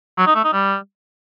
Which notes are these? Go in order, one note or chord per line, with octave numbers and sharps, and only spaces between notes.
F#3
D#4
A3
D#4
G3